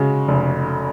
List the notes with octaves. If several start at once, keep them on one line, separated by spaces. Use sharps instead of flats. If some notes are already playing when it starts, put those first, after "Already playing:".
Already playing: C#3 G#3 F#4
F1